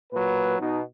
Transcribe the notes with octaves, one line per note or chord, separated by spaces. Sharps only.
A#2 F#3 B4
B2 D#4